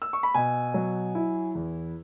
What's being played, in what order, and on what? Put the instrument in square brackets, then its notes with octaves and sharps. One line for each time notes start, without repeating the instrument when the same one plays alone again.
[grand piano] E6
C#6
B5
B2 G#5
F#3
E4
E2